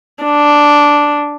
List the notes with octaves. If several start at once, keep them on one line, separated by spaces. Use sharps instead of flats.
D4